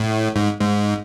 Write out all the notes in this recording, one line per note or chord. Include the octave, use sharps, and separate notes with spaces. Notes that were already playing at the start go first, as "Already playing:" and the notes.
Already playing: A2
G#2
G#2